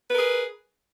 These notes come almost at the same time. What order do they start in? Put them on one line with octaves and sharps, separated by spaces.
B4 A#4 G#4